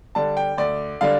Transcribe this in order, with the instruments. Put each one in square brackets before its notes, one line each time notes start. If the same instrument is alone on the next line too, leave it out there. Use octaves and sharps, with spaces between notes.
[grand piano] D3 G3 D4 A5
G5
D2 D5
D3 G3 D4 F5